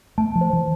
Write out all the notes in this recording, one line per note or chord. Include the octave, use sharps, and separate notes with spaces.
A3 A5
F3
C5
E3